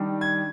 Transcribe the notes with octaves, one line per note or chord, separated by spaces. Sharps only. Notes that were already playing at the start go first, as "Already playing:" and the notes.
Already playing: D#3 G3 D4
G#6